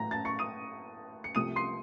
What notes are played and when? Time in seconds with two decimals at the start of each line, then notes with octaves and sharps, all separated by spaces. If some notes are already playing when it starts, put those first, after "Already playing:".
Already playing: A1 A2 F#3 A3 A#5 A#6
0.11 A5 A6
0.25 C#6 C#7
0.39 D#6 D#7
1.24 C#7
1.35 C2 C3 F3 A3 D#6 D#7
1.56 C6 C7